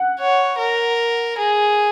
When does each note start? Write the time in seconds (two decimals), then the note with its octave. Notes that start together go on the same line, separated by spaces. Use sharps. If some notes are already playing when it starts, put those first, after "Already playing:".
Already playing: F#5
0.20 C#5
0.58 A#4
1.38 G#4